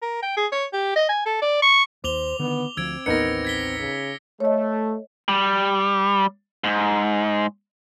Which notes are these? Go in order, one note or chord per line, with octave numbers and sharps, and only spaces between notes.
A#4
G5
G#4
C#5
G4
D#5
G#5
A4
D5
C#6
D#2 C5 D6 F7 G7
D3 D#3 B3
D2 F3 C4 E6 G#6 D7
A1 D#2 B3 D#4 A#4 A#6 C#7
G#6 B6 G7
C#3
A3 C#5 D#5
G3
G#2